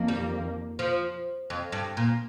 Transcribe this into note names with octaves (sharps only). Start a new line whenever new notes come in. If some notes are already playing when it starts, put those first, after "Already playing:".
Already playing: F2 D#3 A#3
G3
F3
F2
G2
A#2